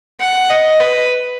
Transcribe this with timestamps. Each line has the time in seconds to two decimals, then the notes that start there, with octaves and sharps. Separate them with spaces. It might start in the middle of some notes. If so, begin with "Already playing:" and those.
0.21 F#5
0.50 D#5
0.80 B4